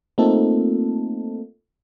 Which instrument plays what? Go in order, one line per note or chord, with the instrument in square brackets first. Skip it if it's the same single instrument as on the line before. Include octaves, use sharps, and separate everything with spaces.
[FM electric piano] A3 A#3 C4 D#4 F4 A4